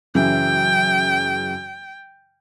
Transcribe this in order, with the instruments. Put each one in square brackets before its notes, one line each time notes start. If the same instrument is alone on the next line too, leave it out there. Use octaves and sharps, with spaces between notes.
[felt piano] F#2 C#3 E3 [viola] G5